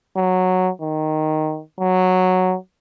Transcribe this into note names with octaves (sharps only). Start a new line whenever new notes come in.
F#3
D#3
F#3